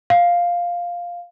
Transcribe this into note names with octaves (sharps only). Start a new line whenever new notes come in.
F5